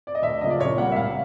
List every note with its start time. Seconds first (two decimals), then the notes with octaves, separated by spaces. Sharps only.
0.07 D5
0.15 D#5
0.22 D2 E5
0.41 C#3 F3 A#3 D#5
0.50 D5
0.60 A#2 C#5
0.78 G3 A#3 F#5
0.92 E5
0.96 C#2 F5